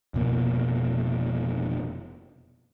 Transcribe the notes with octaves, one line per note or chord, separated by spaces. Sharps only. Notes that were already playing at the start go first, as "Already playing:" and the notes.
F1 B2 A#3